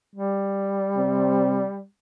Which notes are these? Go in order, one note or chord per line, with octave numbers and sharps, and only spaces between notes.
G3
C3 C4